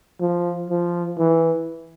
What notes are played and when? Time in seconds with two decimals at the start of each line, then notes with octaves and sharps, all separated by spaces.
0.21 F3
0.70 F3
1.19 E3